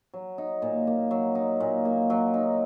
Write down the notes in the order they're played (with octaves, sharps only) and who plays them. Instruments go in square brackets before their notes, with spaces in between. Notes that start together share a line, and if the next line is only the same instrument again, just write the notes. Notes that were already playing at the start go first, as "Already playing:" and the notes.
[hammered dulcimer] F#3
D#4
A#2
A#3
F#3
D#4
A#2
A#3
F#3
D#4